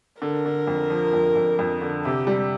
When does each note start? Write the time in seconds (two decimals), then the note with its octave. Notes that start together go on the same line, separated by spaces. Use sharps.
0.22 D3 A#4
0.46 D3
0.67 F2
0.90 F3
1.13 F2
1.36 F2
1.59 F2
1.82 D3
2.05 C3 G4
2.27 G3